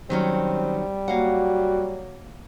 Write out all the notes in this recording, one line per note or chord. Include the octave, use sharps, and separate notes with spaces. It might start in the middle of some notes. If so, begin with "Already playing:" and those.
D#3 F#3 G3 C4 C#4
F#3 A#3 F#4 F5 F#5